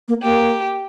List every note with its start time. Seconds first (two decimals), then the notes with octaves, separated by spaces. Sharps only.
0.08 A#3
0.23 A#3 G4